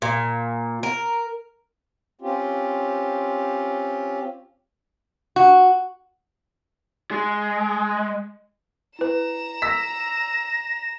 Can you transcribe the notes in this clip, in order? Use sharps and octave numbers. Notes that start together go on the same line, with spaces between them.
A#2
A#4
C4 C#4 F4 G4
F#4
G#3
E4 B4 A#5 E7
E6 A#6 B6